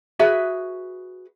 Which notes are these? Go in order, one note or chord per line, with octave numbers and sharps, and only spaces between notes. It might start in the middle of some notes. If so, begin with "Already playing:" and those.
F#4 G#4 B4 E5